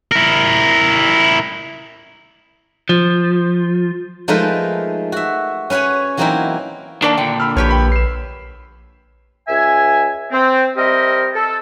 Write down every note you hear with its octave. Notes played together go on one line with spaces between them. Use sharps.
E4 A#4
F3
F3 G#3 A3 D#4 A#4 B4
F#4 E5
C#4 B4 C#5 F#5 G#5
E3 F#3 A#3 C4 D#4 E4
D#3 A#3 D4 D5 A5 D7
A#2 D3 G5
B5 E6 F6
A#1 G4 B4 C#5 F6
G5 B5 B6
C7 E7
C#2 E5 G#5
C4
G3 C4 G4 A#4 D#5 E5
A4